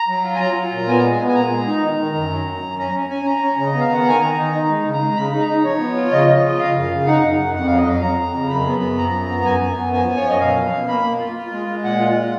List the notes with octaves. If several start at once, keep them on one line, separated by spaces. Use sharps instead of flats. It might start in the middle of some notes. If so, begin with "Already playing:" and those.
Already playing: A#5
F#3
F4
G#5
F#3 A#5
F4
A#2
B3 G#5
G#3 A#5
G#5
B3
G#5
A#2 A#5
G#3
D#4
D#3
D#3
F#2
F#3
F#2
F#2
C#4 A#5
C#4
C#4 G#5
C#4 A#5
C#4
C#3
D#5
B3
F5
D#3
F#5
D#3 G#5
D#3 A#5
D#4
D#4
G#3
C#3
A#5
G#3
C#3 B5
D#4
A#5
D#4
F3 C#5
B3
F4
C#3 D#5
F3
F4
C#3 F5
F#2
C#3
D#4 F#5
F#2
F#2
F2 F#5
F#3 F5
D#5
F2 F5
F2 A#5
F2
C#3
F#2 B5
B3
F#2
F3 A#5
F#2
B3
F#2 G#5
F#2
B3
F3 G#5
F3
C#5
F#2 D#5
B2 F5
B2
B2
A#3 B5
A#3
F4
F4
G#3
G#3
A#2 F#5
F4
F4